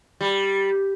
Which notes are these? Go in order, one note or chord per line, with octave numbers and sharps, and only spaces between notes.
G3